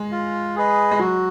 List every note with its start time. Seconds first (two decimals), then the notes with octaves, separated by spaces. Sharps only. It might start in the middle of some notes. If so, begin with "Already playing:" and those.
Already playing: G#3
0.12 F4
0.56 G#4 B4 D#5
0.91 G#3
0.99 F#3 F#4